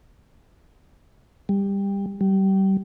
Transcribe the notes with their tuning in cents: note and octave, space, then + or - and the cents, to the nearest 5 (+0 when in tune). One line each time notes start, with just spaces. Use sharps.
G3 +20
G3 -25